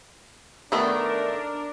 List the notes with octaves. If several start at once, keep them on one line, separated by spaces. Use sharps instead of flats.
D#3 A3 B3 D4 A#4